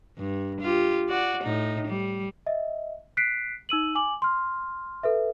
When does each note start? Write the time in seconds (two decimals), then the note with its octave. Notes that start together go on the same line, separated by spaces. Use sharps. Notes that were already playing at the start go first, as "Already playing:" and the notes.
0.18 G2
0.61 F4 G4
1.09 F#4 D5
1.43 A2 D#4
1.87 G3
2.46 D#5 E5
3.17 F#6 B6 C7 D7
3.69 D#4 E6 D#7 F#7
3.95 G#5 D6 F#7
4.22 C6 F6
5.03 A4 B4 E5